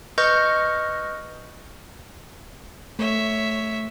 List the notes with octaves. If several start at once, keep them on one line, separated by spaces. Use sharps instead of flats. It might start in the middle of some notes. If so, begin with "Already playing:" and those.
B4 D#5 C#6 F6 G6 A#6
A3 C#5 E5